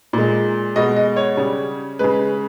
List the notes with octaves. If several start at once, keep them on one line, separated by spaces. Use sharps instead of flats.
A#2 G#3
B2 G#3 D#5
D#5
C#5
C#3 G3
C#3 G#3 B4